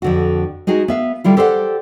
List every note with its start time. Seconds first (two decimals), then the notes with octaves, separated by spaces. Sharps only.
0.02 F2 D3 F#4
0.67 G#3 D#4 F#4 G#4
0.88 B3 E5 F5
1.24 D3 G3 E4 F4
1.37 G4 A4 C5 D5 F5 F#5